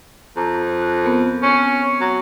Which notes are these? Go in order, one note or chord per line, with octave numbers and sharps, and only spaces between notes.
F2 A#5
F#6
B3 C4 A#4
C#4
F#3